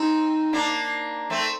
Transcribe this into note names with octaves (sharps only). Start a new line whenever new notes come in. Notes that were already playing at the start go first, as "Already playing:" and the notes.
Already playing: C4 D#4
A#3 D4
A3 C4